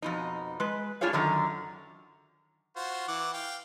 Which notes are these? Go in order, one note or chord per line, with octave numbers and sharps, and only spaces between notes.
F2 B2 D#4
G#3 B4
A2 D4 F4 G#4 C#5 F5
F#2 D3 D#3 A#5
F4 F#4 C5
E3 F#5 D6
F5 G5